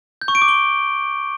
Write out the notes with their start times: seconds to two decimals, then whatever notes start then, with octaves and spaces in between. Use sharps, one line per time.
0.21 G6
0.28 C#6
0.35 D7
0.42 D6
0.48 G7